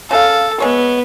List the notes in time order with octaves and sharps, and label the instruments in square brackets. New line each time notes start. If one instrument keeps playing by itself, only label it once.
[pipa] C#3 F5 [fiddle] A4
[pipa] G#3 C#5 [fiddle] B3